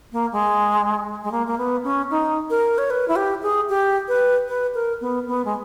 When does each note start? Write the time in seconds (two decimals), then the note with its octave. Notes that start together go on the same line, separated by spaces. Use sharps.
0.12 A#3
0.32 G#3
1.23 G#3
1.32 A#3
1.47 A#3
1.58 B3
1.84 C#4
2.10 D#4
2.50 A#4
2.78 C#5
2.90 B4
3.08 E4
3.16 G4
3.42 G#4
3.69 G4
4.08 B4
4.48 B4
4.74 A#4
5.01 B3
5.27 B3
5.45 G#3